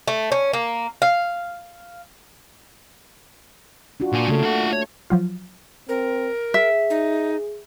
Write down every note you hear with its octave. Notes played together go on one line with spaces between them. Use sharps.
A3
C#4
A#3
F5
D4 F4 F#4
A#2 D4 G#5
C#3 A3 A#3 A4
F4 F#5
C#5
F3 F#3 F4
C4 A#4
G#4 E5
D#4